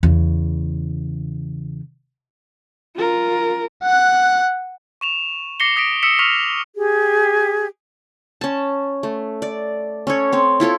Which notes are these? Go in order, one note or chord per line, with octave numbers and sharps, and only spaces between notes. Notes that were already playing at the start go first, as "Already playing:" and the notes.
E2 C#3
F4 A#4
F#5 F#6
C#6 E7 F7
D6 A#6 C7 C#7 G7
D#6 A#6 B6 D7
D#6 E6 B6 C#7 E7
C#6 F6 B6 F7
G4 G#4
C#4 A5
A3
D5
C#4 A4 C#5
C4 C#5
E4 F4 A4 C#5